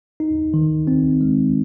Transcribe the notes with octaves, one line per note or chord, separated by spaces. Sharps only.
D#4
D#3
C4
G#3